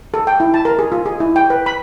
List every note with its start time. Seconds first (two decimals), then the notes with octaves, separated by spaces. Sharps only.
0.14 A4
0.27 G5
0.40 E4
0.54 A5
0.65 A#4
0.79 G#4
0.92 F4
1.06 G#4
1.20 E4
1.36 G5
1.50 B4
1.66 B5